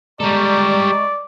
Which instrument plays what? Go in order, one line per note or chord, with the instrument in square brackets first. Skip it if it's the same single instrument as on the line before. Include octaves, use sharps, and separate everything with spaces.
[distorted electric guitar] G3 A4 [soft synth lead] G#3 [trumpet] D5 [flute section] A#5 C#6